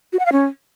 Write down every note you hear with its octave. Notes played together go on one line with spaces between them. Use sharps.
F#4
F#5
F5
C#4